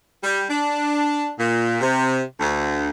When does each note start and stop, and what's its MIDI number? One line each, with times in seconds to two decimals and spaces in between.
0.24 0.44 55
0.50 1.31 62
1.39 1.81 46
1.81 2.20 48
2.39 2.90 38